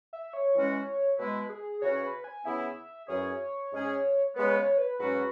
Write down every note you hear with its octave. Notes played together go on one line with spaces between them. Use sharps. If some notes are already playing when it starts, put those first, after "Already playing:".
E5
C#5
E3 G#3 C#4 F#4
B2 G#3 E4 B4
G#4
C#3 E3 C#4 F#4 C#5
B4
G#5
C#3 E3 B3 E4 E5
F#2 E3 C#4 G#4 C#5
G#2 G#3 C#4 G#4
C#3 G#3 B3 B4
C#5
B4
G#2 F#3 C#4 F#4 B4